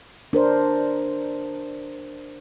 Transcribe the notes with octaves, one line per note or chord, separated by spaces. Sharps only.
D4 A#4 C5